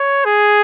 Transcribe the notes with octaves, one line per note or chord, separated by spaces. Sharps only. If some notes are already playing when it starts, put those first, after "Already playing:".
Already playing: C#5
G#4